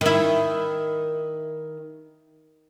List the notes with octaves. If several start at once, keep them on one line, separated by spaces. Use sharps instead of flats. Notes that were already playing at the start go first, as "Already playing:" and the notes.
D#3 E4